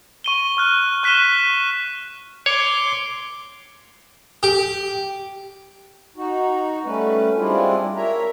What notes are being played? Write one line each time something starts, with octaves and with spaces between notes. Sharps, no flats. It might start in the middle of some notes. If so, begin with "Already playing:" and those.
C#6 D#7 G7
C#6 F6 F#6
C#6 F#6 B6 D#7 E7 G7
C#5 C6 D6
G4
D#4 F#4
G3 A3 C#4 B4
G3 G#3 C4 D4 E4 F4
A#4 C#5 E5 A#5